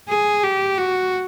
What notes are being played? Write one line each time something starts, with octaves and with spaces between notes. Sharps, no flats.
G#4
G4
F#4